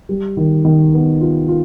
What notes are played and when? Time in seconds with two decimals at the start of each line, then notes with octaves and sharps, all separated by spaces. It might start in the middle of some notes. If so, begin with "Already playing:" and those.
0.09 G3
0.37 D#3
0.65 D#3
0.93 B3
1.21 F4
1.48 F4